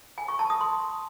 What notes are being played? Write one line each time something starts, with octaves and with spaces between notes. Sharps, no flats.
G#5
C#6
A5
D#6
C6